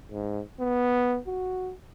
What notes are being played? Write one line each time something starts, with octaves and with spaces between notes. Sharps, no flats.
G#2
B3
F#4